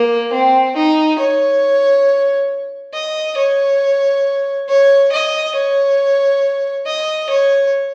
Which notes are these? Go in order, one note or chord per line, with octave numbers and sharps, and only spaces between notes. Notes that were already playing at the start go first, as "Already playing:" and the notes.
Already playing: A#3
C4
D#4
C#5
D#5
C#5
C#5
D#5
C#5
D#5
C#5